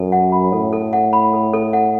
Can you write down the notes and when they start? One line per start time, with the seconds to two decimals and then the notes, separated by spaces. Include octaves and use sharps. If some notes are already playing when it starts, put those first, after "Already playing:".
Already playing: F#2 A4
0.12 F#5
0.32 B5
0.53 A2 A4
0.73 A4
0.93 F#5
1.13 B5
1.33 A4
1.53 A4
1.73 F#5